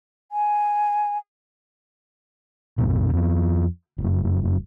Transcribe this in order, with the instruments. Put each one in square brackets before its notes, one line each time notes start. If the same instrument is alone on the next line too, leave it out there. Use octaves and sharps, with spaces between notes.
[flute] G#5
[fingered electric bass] A#1 F2 G#2 B2
F2 F3 B3
F1 F#2